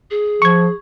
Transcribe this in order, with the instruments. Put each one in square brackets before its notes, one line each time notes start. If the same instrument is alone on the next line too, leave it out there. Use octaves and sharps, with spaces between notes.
[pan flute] G#4
[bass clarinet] F3 [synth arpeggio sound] C#6 G#6